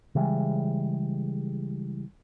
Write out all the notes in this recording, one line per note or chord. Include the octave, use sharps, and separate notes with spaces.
C#3 E3 G3 G#3